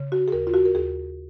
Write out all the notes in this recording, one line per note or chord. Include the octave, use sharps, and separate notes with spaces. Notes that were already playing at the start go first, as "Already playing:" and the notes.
Already playing: C#3
F#4
G#4
D#2 A#4
F4
F#4
A#4
D#2 G#4